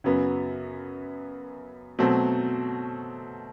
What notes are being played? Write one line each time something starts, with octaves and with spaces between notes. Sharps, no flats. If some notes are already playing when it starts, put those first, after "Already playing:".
F#2 C#3 F#3 B3
B2 F#3 A3 C4